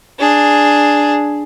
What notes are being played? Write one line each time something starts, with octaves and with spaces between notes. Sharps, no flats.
D4 G#4